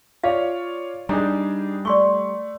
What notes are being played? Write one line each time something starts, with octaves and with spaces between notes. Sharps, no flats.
F4 C#5 D5 F5
G3 D4 D#4 G#4 A#5
A3 D5 C6 C#6